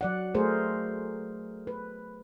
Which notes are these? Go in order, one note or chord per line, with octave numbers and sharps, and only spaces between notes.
F#3 D5 F#5
A3 G#4 A#4 C5
B4